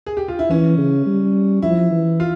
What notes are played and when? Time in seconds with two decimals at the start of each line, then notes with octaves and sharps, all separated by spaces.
0.06 G#4
0.17 G4
0.28 F4
0.39 E4
0.50 E3 C#4
0.78 C#3
1.06 G3
1.62 F3 E4
1.91 E3
2.20 F4